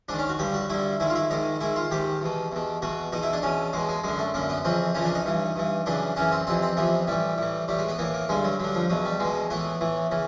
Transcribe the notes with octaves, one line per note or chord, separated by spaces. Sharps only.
G#2 D#3 D4
C#4
F#4
G2 D3 G4
F#4
G2 D3 E4
G#2 D#3 E4
F4
E4
G#2 D#3 D#4
G#2 D#3 E4
F4
G#2 D#3 G4
E2 B2
E2 B2
E2 B2 F#4
E2 B2 D#4
E4
D4
E2 B2 C#4
E2 B2 G#3
G#3
F#2 D3 G#3
A3
F#2 D3 A#3
B3
F2 C#3 E3 C4
F2 C#3 E3 C#4
D4
D#4
G2 E3
G2 E3
F#2 C#3 E3 D4
F#2 C#3 E3 C#4
C4
F2 C3 E3 C4
C4
F2 C3 E3 B3
A2 E3 G3
A2 E3
A2 E3 G3
G#3
B3
A2 E3 A#3
A#3
G2 D3 G#3
F#3
G2 D3 F#3
F3
E2 B2 F#3
G3
E2 B2 G#3
A2 E3 B3
A2 E3
C#3 E3